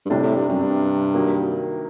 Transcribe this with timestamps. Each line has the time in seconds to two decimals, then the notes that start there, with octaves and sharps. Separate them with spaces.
0.06 G2
0.10 A2 C3 G3 D4
0.23 A2
0.37 G2
0.49 F#2
0.62 G2
1.14 D#3 F#3 A#3